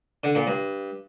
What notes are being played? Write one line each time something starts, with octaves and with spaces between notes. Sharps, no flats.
D3
A#2
G2